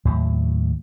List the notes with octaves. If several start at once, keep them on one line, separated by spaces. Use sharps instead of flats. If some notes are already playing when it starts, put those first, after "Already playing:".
D#2 A2 F#3